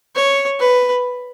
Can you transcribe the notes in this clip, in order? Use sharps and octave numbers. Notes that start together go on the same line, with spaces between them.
C#5
B4